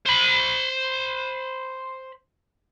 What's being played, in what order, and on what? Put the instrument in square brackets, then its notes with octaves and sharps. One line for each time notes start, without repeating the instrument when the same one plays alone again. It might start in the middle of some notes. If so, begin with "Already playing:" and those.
[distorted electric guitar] C5 B5